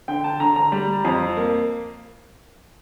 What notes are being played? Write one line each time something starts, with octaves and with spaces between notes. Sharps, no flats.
D3 G5
A5
D3 A#5
A#5
G3
F2
A#3